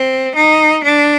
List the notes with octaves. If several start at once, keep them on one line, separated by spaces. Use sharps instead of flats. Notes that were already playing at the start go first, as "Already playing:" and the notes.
Already playing: C4
D#4
D4